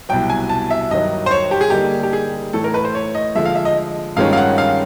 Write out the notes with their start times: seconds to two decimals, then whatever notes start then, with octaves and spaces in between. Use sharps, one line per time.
0.09 C2 B2 F#3 G5
0.30 G#5
0.49 A5
0.71 E5
0.90 G2 D#3 F#3 D#5
1.26 C5
1.31 C#5
1.51 G4
1.61 G#4
1.70 D3 G3 A#3 D#4 G4
2.03 G4
2.13 G#4
2.53 A2 E3 A3 A4
2.64 A#4
2.74 B4
2.85 C5
2.95 C#5
3.15 D#5
3.35 D3 F3 G#3 E5
3.45 F5
3.55 E5
3.65 D#5
4.16 G2 D#3 G#3 C#4 F4 F5
4.33 F5
4.37 F#5
4.58 F5